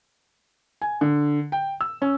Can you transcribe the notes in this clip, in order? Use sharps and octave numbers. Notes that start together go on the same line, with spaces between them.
G#5
D3
G5
E6
C#4